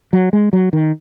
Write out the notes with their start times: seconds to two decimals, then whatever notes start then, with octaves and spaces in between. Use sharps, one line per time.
0.13 F#3
0.33 G#3
0.53 F#3
0.73 D#3